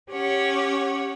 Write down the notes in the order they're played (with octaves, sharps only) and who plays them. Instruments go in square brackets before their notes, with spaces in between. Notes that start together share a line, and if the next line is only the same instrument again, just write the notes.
[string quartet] C#4 G4 C#5 F#5